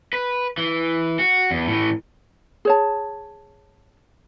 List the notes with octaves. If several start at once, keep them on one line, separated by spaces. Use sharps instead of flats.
B4
E3
F#4
E2
A2 E3
G#4 C#5 A5